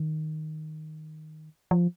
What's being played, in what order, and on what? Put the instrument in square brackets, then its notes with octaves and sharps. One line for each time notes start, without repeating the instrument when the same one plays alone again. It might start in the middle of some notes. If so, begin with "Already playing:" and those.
Already playing: [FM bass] D#3
F3